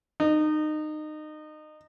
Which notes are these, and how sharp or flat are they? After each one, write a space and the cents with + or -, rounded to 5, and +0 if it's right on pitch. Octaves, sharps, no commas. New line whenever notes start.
D#4 -25